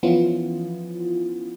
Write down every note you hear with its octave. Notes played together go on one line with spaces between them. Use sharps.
E3 F3 B3 C#4 E4 F4